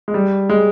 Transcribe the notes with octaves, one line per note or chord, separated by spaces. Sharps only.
G#3
G3
G#3